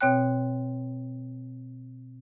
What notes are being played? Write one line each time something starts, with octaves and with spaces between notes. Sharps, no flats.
B2 C4 C#5 G5 F#6